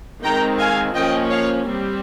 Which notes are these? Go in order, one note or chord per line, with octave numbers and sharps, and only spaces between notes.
D#3 G#3 C4 G5 A#5
F5 G#5
F3 A#3 C#4 D#5 G5
C#5 F5
G3 C4